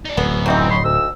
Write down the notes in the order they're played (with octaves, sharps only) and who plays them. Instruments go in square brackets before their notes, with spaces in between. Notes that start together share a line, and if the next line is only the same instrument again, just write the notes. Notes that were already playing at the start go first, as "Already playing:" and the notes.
[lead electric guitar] D#4 D5
[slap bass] D1 [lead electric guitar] F#2 [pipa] B3
[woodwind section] E3 C4 [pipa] F#3 G3 D#4
[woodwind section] C#5 B5 C6
D2 E6